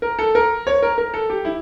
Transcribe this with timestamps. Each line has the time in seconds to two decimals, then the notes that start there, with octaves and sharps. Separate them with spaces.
0.02 A#4
0.19 A4
0.35 A#4
0.67 C#5
0.82 A#4
0.98 A#4
1.14 A4
1.30 G4
1.45 E4